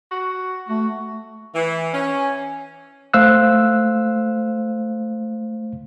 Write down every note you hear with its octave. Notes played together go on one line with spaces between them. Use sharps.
F#4
A3 F#4
E3
C#4
A3 C5 F5 E6 F#6